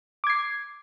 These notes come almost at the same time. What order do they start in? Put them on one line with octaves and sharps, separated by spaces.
D6 G#6 C7